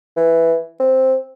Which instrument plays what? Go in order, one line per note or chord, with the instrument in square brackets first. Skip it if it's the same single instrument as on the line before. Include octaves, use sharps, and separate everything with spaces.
[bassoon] E3
C4